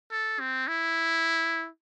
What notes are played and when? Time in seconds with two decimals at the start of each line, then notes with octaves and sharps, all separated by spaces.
0.11 A4
0.40 C4
0.68 E4